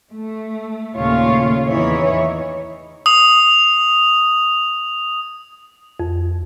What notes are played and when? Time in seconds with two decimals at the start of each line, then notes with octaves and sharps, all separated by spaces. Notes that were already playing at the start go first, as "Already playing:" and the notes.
0.11 A3
0.96 D#2 A#2 C#3 A3 F4 C#5
1.67 E2 E3 D#4 E4 C#5
3.06 D#6 F7
6.00 F2